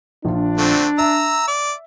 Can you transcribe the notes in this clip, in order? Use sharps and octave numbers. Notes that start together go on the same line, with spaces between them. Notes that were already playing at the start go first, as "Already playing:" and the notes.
A#1 D4 F4
D3 A3 C4
E5 A#5 E6
D5